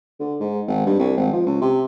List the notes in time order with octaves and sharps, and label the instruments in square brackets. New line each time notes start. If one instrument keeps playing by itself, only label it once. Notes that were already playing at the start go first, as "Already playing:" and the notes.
[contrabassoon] D3
G#2
G#1
G2
C2
G#1
F3
C#2
C3